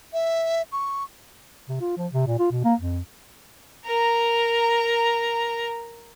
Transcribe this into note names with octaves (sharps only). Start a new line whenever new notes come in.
E5
C#6
C3
F4
F3
C3
A#2
F4
B2
A#3
F2
A#4 A#5